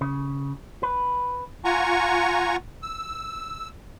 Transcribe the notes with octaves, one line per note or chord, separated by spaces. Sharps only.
C#3
B4
F4 F#5 G#5 A#5 C#6
E6